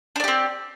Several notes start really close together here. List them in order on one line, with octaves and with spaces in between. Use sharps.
D4 D5 G4 C4